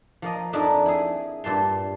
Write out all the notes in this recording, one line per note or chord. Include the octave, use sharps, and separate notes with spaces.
F3 A#3 D#5
F2 D4 D#4 A#4 E5
E4 G#4
G2 A#2 A5 C6